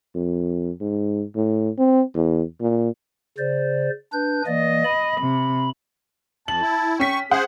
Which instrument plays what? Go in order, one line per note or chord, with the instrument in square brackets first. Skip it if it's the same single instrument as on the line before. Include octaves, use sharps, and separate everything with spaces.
[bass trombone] F2
G#2
A2
C4
E2
A#2
[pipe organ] C#3 C5 D5
D4 B4 G6
[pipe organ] E3 A#3 D5 [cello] D#5
[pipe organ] B5
[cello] C3
[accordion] F2 [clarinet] A5 [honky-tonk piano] F#7
[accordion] E4
[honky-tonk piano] C#4 B6 [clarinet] G5 [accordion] C#6
[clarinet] C#4 [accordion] G#4 C5 [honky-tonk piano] F#5